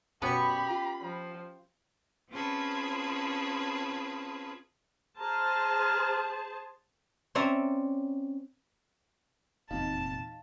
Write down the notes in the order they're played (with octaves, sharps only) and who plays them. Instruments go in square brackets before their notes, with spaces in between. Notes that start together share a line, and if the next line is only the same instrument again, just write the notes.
[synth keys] F#2 B2 C#6 [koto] B3 C#4 B4 [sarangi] G4 [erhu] B5
[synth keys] F4
[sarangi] F3
[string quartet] C4 C#4 F4 G#4 B4 A5
[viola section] G#4 C5 A5 [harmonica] A#5 F6
[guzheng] C4 C#4 C#5 D5 E5 A#5
[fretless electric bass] F1 C4 [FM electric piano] E2 A#2 D#4 [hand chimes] F5 [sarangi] A5